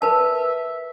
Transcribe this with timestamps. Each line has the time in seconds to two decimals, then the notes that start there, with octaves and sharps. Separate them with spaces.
0.02 A#4 B4 E5 A5